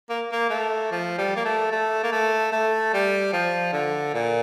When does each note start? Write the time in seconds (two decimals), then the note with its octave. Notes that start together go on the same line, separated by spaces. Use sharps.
0.10 A#3
0.32 A#3
0.50 A3
0.92 F3
1.18 G3
1.36 A#3
1.45 A3
1.72 A3
2.03 A#3
2.12 A3
2.52 A3
2.93 G3
3.33 F3
3.73 D3
4.14 A#2